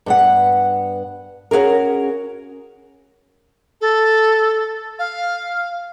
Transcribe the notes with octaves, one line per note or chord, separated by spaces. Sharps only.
G2 B3 F#5
C#4 F#4 G#4 A#4
A4
F5